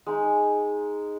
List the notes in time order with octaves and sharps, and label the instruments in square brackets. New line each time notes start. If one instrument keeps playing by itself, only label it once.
[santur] G#3 D#4